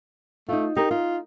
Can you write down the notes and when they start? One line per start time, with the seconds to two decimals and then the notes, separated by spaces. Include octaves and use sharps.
0.49 A3 D#4 F4
0.77 D#4 G4 A#4
0.91 D#4 F4